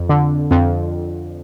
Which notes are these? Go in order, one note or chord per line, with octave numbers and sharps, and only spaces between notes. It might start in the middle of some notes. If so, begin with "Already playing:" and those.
Already playing: F2
D3
F2